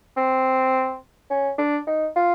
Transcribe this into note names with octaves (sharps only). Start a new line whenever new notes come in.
C4
C#4
D4
D#4
F4